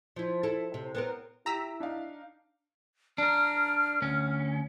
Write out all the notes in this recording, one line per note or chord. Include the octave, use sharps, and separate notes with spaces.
F3 E4
E4 A4
C3
B3 C4 A#4
E4 G4 A#5 E6 B6
D4 D#4 F5
D4 A#4 F6
D2 C#4